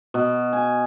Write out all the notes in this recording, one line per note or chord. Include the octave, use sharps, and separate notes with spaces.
B2
G#5